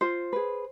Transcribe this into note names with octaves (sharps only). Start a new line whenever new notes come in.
F4 C5
G#4 B4